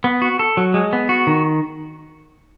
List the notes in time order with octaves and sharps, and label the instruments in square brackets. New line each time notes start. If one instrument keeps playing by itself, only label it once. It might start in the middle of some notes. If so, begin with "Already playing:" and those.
[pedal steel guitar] B3
F#4
A4
F#3
G#3
B3
F#4
D#3